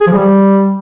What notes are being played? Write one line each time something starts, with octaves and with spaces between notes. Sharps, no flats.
G#4
F3
G3